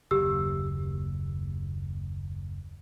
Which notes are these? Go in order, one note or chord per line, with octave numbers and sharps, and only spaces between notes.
F#1 D#2 G4 E6